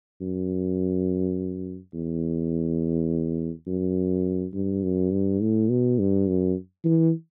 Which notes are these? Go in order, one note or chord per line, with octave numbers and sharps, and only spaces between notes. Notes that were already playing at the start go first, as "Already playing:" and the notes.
F#2
E2
F#2
G2
F#2
G2
A2
B2
G2
F#2
E3